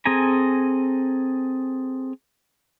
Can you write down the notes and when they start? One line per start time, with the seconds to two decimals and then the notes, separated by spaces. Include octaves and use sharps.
0.05 C4 G#4 A4 G#5 A#5